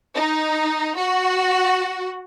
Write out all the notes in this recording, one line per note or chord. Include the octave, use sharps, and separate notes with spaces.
D#4
F#4